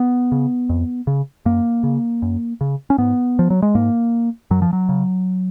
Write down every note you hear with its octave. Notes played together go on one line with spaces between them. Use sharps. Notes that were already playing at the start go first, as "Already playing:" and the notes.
Already playing: B3
C#3
F2
C#3
F#2 A#3
C#3
F#2
C#3
C#4
G#2 B3
F3
F#3
G#3
G#2 A#3
F#2 F#3
F3
F#3
C#3